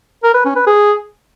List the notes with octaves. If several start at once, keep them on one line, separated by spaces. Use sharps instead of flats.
A#4
B4
C#4
B4
G#4